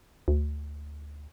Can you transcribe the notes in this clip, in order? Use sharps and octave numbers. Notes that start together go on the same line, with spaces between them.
D2